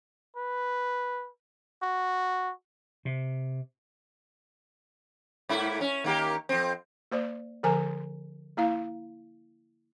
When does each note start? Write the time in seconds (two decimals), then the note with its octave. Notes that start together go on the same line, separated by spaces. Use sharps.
0.36 B4
1.82 F#4
3.05 C3
5.49 G#2 A#3 E4
5.81 C#4
6.04 D#3 A#3 G4
6.49 F2 C4
7.12 A#3 C5 D5
7.63 D3 F3 A#4 G#5 A#5
8.57 A#3 E4 F5